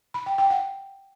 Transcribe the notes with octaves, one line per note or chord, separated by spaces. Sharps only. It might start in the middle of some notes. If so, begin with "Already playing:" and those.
B5
G5
G5
F#5